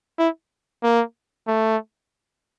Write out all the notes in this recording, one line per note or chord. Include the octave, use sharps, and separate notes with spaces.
E4
A#3
A3